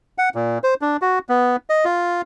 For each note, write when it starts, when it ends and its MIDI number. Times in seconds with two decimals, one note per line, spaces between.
0.18 0.29 78
0.35 0.58 46
0.64 0.74 72
0.82 0.97 62
1.02 1.19 66
1.29 1.56 59
1.70 1.85 75
1.85 2.22 65